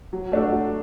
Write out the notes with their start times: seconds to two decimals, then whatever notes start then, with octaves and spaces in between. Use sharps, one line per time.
0.13 F#3
0.32 A3 D4 F#4 A4
0.52 F#3